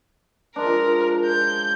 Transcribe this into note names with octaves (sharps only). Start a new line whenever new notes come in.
F3 G#3 D4 A#4
G6